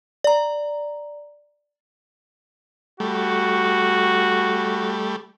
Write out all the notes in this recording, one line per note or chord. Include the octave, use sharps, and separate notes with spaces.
D5 A#5
G3 A3 F#4